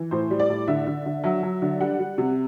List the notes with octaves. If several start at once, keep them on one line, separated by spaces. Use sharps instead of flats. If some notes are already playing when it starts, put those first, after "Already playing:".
Already playing: E3
A2 C5
G3
D5
A2
D3 E5
D3
D3
F#3 E5
F#3
D3
G3 F#5
G3
C3